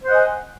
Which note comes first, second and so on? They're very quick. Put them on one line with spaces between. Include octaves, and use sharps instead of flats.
C5 F#5 D#5 G#5